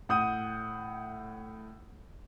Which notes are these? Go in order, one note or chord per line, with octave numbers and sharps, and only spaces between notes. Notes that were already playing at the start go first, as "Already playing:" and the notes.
A2 F#5 D#6 G6 D#7